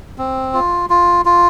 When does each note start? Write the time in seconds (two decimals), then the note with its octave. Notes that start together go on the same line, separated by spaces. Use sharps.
0.18 C4
0.54 F4
0.90 F4
1.25 F4